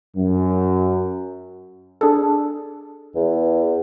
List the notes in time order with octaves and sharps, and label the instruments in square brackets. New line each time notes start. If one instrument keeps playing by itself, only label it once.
[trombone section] F#2
[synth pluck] D4 G#4 A4
[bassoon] E2